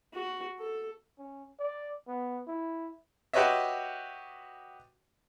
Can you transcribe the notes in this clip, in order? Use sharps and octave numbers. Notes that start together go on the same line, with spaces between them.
F#4
A4
C#4
D5
B3
E4
F#4 G4 B4 C#5 D#5 E5